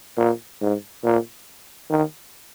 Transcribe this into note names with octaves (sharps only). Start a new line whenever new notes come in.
A#2
G#2
A#2
D#3